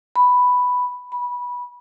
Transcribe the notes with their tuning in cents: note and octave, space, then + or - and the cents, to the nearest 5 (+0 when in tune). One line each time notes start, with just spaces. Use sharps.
B5 +5
B5 -15